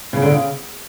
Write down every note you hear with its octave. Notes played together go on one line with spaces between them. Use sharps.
C#3
D3
C#3